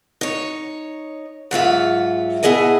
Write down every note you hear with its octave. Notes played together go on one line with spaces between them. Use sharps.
D#4 C#5
G#2 F#3 F4 E5
B2 B3 E4 G#4 D#5 G#5